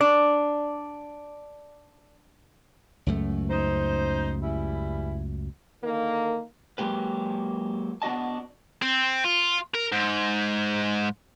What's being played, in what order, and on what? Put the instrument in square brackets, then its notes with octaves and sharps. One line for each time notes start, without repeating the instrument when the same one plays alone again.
[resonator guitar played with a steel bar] D4 [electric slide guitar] D5
[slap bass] C#2 F#2 A3
[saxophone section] D#4 C5
E3 G3 E4
[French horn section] D3 D#3 A#3
[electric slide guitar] F#3 G#3 A#3 G4 B4
B3 D4 F#4 D#5 A5
[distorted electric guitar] C4
F4
A#4
G#2